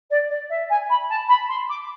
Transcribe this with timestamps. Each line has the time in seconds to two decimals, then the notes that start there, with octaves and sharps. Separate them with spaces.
0.10 D5
0.29 D5
0.49 E5
0.70 G#5
0.89 B5
1.09 A5
1.28 B5
1.48 C6
1.69 D6